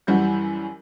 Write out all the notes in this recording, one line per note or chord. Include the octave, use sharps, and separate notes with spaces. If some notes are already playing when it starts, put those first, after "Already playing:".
F#2 E3 G3 F#4 G6